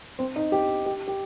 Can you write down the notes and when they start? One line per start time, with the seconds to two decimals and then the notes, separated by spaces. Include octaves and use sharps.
0.19 C4
0.36 D#4
0.52 G4
0.86 G4
1.08 G4